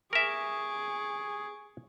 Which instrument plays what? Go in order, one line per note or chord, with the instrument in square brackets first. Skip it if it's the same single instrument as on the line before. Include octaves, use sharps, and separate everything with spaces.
[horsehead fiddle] G#4 [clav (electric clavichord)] A#4 E5 [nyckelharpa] C#6 D6